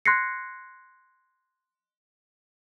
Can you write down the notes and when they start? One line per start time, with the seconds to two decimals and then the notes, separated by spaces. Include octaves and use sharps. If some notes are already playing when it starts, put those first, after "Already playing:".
0.05 C6 F#6 G#6 A#6 C7 C#7